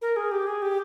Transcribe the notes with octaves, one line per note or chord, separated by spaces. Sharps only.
A#4
G#4
G4
G#4
G4